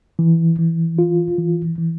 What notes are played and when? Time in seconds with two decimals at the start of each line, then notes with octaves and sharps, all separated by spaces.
0.19 E3
0.59 E3
0.99 F4
1.38 E3
1.78 E3